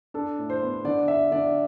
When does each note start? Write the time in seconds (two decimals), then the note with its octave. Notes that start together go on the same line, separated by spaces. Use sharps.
0.14 D4 A4
0.39 A2
0.50 C5
0.62 B3
0.84 D3 D5
1.08 D3 E5
1.31 D3 D5